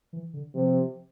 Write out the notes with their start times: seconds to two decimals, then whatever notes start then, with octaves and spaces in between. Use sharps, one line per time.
0.13 E3
0.34 D3
0.54 C3 F3